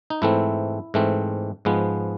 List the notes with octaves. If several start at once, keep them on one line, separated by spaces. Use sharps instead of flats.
D#4
G#2 E3 A3 C4 E4
G#2 E3 A3 C4
G#2 F3 G#3 B3